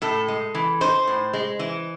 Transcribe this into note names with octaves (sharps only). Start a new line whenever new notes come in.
A2 A4
G#3
E3
D#4 C5
A2
G#3
E3